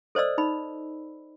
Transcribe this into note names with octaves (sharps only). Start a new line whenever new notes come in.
A4 C5 D5 D#5 E6
D#4 B5